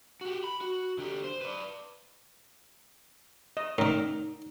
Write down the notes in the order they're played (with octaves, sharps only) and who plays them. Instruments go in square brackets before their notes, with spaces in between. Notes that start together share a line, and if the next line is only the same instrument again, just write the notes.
[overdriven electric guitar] F#4 G4
B5
F#4
D3 G4
C5
B4 D5
[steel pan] D#5
[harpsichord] A2 D3 [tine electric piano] D#4 [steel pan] A#4